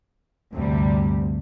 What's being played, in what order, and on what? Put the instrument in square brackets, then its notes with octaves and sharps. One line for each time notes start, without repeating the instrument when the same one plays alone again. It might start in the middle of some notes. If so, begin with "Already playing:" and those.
[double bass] D2 G2 [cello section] C3 G3